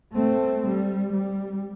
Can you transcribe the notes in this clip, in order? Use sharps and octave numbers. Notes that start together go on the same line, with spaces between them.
A3 C4
G3
G3